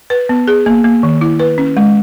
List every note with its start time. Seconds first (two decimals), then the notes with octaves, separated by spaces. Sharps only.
0.10 B4
0.29 B3
0.48 G#4
0.66 A#3
0.84 A#3
1.03 D#3
1.21 E4
1.40 B4
1.58 C#4
1.77 G#3